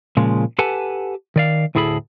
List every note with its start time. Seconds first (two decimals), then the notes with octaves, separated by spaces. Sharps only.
0.17 A#2 C#3 F3 G#3
0.59 G4 A4 B4 F#5 G#5 A5
1.36 D#3 D5 F5
1.75 D2 A2 E4 G#4 A4 B5